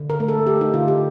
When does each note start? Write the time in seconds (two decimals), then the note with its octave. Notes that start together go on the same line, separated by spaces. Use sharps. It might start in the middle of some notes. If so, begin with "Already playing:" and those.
Already playing: D3
0.10 A#4
0.20 A3
0.28 A4
0.47 A3 G4
0.61 D#4
0.74 D3 F4
0.88 G4